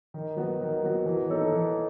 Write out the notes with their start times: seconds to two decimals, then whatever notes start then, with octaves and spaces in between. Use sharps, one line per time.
0.14 D#3
0.36 F#3 B3 F#4
0.61 D#3
0.84 F#3 B3 F#4
1.06 E3
1.30 B3 D#4 A4 C#5
1.52 E3